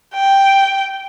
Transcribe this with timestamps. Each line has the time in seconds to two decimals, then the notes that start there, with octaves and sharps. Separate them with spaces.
0.15 G5